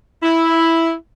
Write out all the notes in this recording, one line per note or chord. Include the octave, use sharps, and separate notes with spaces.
E4